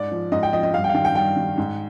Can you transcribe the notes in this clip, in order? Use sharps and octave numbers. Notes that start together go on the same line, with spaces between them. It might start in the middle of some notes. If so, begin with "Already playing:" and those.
Already playing: G#2 D5
F3
G#2 D#5
G5
F3 D#5
D#5
G2 F5
G5
F5
D#3 G5
G5
G2 G5
D#3
G#2